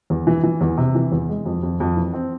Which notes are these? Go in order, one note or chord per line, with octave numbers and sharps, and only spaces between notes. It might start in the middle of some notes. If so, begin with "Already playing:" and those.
E2
E3
E3
E2
C3
E3
E2
G#3
F2
F2
F2
E3
C4